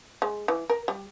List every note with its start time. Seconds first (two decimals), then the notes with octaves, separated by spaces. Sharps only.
0.22 G#3
0.48 E3
0.70 A#4
0.88 G3